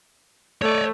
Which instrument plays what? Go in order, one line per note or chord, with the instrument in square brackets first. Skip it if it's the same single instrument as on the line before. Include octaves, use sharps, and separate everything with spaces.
[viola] A3 [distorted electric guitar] C#5 D5